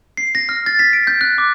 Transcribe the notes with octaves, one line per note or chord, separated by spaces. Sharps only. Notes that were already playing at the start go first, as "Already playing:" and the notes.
C7
A#6
F6
A6
B6
D7
G6
F#6
D6